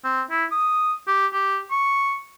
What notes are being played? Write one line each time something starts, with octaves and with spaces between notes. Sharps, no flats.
C4
E4
D#6
G4
G4
C#6